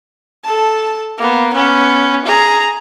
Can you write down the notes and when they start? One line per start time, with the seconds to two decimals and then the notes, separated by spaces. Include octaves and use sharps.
0.44 A4 A5
1.18 A#3 B3
1.54 B3 C#4
2.25 G#4 A#5